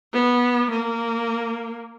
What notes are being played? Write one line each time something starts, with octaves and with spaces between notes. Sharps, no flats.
B3
A#3